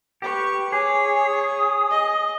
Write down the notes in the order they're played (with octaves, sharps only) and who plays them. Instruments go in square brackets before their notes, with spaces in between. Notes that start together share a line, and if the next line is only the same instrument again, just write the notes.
[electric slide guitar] G4 [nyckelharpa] B4 C#6
[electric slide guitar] G#4 [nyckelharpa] C#5 [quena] D6
[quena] D#6
[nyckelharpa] D#5